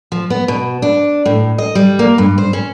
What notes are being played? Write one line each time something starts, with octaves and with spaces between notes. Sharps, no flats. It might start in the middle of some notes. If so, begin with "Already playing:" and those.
F3
B3
B2
D4
A2
D#5
G3
A#3
G2
C5
C#4